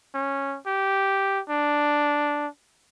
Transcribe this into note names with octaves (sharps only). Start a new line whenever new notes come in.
C#4
G4
D4